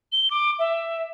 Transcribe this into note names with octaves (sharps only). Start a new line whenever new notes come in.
G7
D6
E5